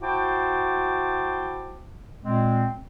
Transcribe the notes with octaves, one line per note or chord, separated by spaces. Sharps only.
E4 F#4 C5 G5 A5 D6
A#2 G#3 C4